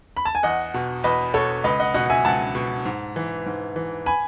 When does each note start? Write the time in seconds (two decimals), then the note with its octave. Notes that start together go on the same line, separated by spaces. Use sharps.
0.17 B5
0.25 A5
0.35 G#5
0.43 E2 D#5 F#5
0.74 B2
1.04 E2 B4 D#5
1.34 B2 A4 C#5
1.64 C#2 B4 D#5
1.80 D#5 F#5
1.94 B2 D#5 F#5
2.05 F#5
2.10 E5 G#5
2.25 C#2 F#5 A5
2.55 B2
2.85 G#2
3.16 E3
3.46 G#2
3.76 E3
4.06 G#5 B5